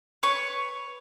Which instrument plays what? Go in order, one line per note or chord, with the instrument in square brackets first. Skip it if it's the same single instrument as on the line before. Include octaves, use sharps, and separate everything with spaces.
[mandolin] B4 C#5 C#6